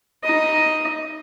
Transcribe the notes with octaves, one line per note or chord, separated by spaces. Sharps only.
D#4 D#5